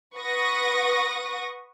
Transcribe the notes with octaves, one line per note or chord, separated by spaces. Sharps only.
B4 F#5 C#6 D#6 A#6